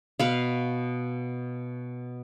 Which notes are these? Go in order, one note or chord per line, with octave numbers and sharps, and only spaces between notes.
B2 B4 F5